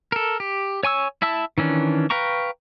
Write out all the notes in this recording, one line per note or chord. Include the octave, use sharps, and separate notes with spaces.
A4 A#4
G4
C#5 G#5 C#6 E6
E4 E5 A5 E6
D#3 E3 C#4 D4
B4 F5 G5 A#5 C#6